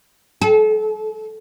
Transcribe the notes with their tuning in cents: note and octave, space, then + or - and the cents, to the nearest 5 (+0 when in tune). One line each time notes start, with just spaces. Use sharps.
A4 -35